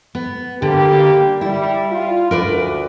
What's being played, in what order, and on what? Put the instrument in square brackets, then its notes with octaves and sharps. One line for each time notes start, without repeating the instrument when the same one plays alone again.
[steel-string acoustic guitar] B3
[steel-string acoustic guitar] D3 [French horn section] G3 A#3 G4
[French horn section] G3 [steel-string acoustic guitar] E4
[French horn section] F4
[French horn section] D2 [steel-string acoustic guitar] A#4 B4 D5